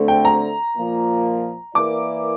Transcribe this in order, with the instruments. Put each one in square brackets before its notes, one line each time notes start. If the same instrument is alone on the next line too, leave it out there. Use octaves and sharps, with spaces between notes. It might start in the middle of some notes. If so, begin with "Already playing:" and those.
Already playing: [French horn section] D2 D3 A3 C4
[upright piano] G5
A#5
[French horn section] A#2 F3 A#3
[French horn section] E3 A#3 E4 A#4 D5 [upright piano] D6